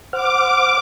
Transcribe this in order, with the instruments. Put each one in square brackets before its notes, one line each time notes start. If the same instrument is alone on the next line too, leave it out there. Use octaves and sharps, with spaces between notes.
[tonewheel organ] C5 F#5 F6 [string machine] D6